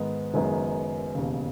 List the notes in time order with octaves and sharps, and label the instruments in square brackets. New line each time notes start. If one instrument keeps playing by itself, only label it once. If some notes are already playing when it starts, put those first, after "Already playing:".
Already playing: [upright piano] G#2 D#3 G#3 B3
F#1 F#2 D#3 G#3 B3
E1 D#2 C#3